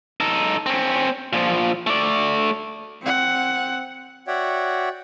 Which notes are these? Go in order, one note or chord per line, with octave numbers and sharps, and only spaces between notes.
D#4 A4
C4 C#4
A#2 F3
A3 D5
C4 F#5
F#4 C#5 D5 E5 F#5 G5